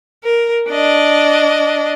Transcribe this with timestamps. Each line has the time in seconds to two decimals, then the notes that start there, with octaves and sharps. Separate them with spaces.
0.24 A#4
0.70 D4 D#5